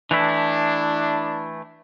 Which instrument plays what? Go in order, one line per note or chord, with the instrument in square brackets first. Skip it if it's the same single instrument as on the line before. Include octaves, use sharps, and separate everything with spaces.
[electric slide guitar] E3 A3 E4 [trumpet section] D4